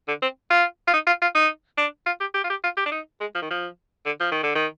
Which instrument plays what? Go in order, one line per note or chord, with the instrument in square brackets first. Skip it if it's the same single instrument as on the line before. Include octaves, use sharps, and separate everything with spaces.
[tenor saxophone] D3
C4
F4
F4
D#4
F4
F4
D#4
D4
F4
G4
G4
F4
G4
F4
G4
D4
D#4
G#3
F3
D#3
F3
D3
F3
D#3
D3
D#3